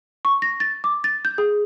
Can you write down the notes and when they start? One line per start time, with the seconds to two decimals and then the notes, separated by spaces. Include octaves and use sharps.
0.25 C#6
0.42 A#6
0.60 A6
0.84 D6
1.04 A6
1.25 G6
1.38 G#4